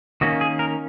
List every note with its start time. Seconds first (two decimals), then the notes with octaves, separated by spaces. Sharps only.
0.21 D#3 A#3 C#4 F#4
0.41 G#4
0.59 A#4